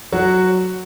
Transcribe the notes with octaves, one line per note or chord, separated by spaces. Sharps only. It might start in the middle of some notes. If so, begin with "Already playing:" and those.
F#3 F#4